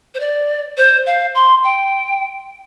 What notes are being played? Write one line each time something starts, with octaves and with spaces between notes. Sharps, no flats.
C5
D5
C5
F5
C6
G5